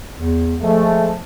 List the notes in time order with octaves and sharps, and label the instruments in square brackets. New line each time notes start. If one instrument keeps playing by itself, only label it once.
[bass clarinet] E2
[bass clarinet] F3 [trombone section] G#3 A3